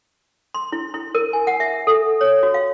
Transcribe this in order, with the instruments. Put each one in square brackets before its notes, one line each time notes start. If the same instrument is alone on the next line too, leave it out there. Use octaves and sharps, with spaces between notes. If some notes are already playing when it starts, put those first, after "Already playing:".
[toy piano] C6
E4
E4
A#4
G#5
F#5
E5
A4
C#5
F#4
F5